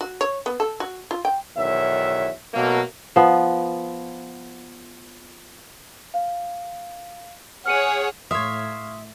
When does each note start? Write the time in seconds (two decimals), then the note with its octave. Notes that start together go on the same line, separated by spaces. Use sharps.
0.01 F#4
0.21 C#5
0.46 B3
0.60 A4
0.80 F#4
1.11 F4
1.25 G5
1.58 B1 E2 D#3 C#5 E5
2.54 B2 F#3 A3 A#3
3.16 F3 B3
6.14 F5
7.66 G#4 C#5 F#5 F6 C#7 D#7
8.31 A2 C#5 E5 F5 C6 D#6